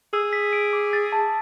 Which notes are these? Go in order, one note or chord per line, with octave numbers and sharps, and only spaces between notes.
G#4 E6
B6
D7
D6
A6
A5